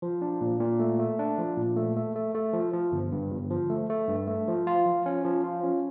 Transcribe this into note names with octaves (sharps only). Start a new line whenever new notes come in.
F3
D4
A#2
A#2
A3
A3
D4
F3
A#2
A3
A3
A3
A3
F3
F3
G1
G2
G1
F3
A3
A3
G2
A3
F3
F4
F3
C#4
F3
F4
C#4